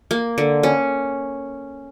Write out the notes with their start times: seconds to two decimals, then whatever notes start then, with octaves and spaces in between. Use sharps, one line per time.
0.11 A#3
0.38 D3
0.63 C#4